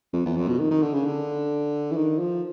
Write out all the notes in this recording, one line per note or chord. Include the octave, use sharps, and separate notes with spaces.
F2
E2
F2
B2
D#3
D#3
D3
C#3
D3
E3
D#3
F3